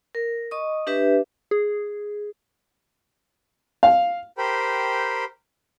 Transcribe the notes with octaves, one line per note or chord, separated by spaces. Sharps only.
A#4
D#5 C#6 D#6
D4 G4 B4 E5
G#4
F5
G4 A#4 C5 G5 B5